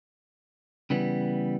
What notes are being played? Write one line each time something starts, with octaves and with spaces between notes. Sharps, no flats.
C#3 E3 G3 B3